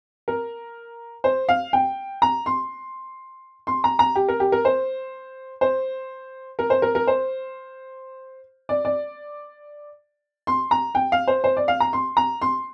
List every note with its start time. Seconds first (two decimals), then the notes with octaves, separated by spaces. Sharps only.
0.28 A#4
1.24 C5
1.49 F5
1.73 G5
2.22 A#5
2.46 C6
3.67 C6
3.84 A#5
3.99 A#5
4.15 G4
4.28 A#4
4.40 G4
4.52 A#4
4.65 C5
5.61 C5
6.59 A#4
6.70 C5
6.82 A#4
6.95 A#4
7.07 C5
8.69 D5
8.85 D5
10.47 C6
10.71 A#5
10.95 G5
11.12 F5
11.28 C5
11.44 C5
11.57 D5
11.68 F5
11.80 A#5
11.93 C6
12.17 A#5
12.42 C6